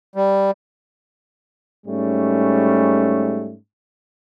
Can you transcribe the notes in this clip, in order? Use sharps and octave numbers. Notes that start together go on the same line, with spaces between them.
G3
G#2 G3 A3 C#4